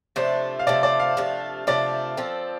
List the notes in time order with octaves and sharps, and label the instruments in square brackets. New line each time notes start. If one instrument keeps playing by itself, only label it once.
[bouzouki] C3 F3 A3 D4 [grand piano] C5
[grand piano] F5
[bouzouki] C3 F3 A3 D4 [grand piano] D5
[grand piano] D5
F5
[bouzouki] C3 F3 A3 D4
[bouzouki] C3 F3 A3 D4 [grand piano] D5
[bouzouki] F3 C4 A4